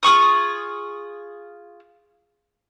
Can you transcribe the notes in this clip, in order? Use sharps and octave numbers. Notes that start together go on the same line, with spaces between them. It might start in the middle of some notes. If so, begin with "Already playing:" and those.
F4 G#4 C#6 D#6